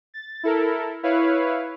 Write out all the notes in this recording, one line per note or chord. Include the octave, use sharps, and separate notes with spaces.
A6
E4 A4 A#4
E4 B4 C#5 F5